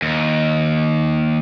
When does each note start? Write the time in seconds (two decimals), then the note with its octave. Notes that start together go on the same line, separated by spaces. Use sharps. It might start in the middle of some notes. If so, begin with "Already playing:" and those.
0.02 D#2